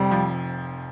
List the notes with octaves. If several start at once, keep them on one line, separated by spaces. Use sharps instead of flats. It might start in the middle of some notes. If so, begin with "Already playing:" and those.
Already playing: F1 G3 C4
F3